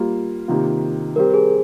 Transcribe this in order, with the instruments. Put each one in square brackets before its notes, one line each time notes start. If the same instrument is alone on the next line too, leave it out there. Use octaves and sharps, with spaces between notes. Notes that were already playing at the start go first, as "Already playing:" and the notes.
Already playing: [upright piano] G3 A#3 F4
C3 D#3 A#3 F4
[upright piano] G3 C4 G4 [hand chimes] A#4
[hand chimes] G#4